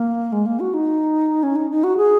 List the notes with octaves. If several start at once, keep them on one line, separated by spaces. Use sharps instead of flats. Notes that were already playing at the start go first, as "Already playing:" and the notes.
Already playing: A#3
G#3
A#3
F#4
D#4
C#4
D#4
D#4
F#4
G#4